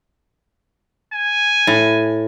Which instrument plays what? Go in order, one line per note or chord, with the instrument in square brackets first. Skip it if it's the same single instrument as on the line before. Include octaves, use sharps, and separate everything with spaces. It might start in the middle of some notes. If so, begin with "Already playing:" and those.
[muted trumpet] G#5
[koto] A2